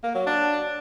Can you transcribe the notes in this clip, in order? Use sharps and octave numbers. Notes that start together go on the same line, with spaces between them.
A#3
F#3
D4